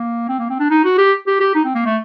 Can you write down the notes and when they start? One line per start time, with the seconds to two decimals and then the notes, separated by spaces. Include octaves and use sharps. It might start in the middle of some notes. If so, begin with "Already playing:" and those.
Already playing: A#3
0.29 C4
0.39 A#3
0.50 C4
0.60 D4
0.70 D#4
0.84 F#4
0.98 G4
1.27 G4
1.40 G4
1.55 D#4
1.65 C4
1.75 A#3
1.86 A3